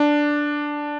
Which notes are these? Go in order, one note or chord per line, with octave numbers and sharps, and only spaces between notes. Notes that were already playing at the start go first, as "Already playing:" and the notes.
Already playing: D4